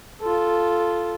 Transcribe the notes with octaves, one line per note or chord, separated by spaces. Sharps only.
F4 A4